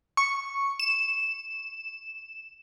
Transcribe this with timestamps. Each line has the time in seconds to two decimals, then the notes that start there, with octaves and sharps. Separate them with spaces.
0.17 C#6
0.80 E7